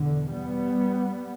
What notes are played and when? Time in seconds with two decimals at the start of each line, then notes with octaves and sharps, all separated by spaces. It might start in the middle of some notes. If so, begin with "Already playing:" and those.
Already playing: E2 B2 D3
0.32 G3 B3